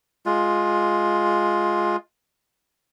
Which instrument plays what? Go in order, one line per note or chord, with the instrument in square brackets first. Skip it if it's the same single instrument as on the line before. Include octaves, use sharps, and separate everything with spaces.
[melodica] G#3 F4